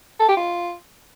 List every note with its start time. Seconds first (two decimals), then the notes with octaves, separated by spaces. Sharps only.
0.20 A4
0.28 G4
0.37 F4